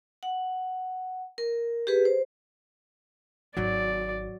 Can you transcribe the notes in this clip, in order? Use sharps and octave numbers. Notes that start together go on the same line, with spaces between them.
F#5
A#4
G4 G#4 B4
C5
G#1 F#3 D#4 D5